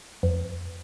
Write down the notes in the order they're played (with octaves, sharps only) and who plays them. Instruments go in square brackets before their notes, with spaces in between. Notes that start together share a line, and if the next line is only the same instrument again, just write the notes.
[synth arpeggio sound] F2